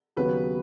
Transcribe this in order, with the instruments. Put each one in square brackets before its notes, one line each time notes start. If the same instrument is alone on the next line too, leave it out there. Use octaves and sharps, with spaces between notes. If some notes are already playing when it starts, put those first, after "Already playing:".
[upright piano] D#2 C#3 F#3 B3 F#4 [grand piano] B4